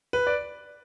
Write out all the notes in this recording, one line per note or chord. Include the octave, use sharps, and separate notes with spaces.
B4
D5